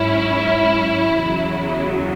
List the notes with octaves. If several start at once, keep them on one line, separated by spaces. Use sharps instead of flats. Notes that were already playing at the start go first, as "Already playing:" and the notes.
Already playing: G#2 F#3 C#4 E4
E2 C#3 F#3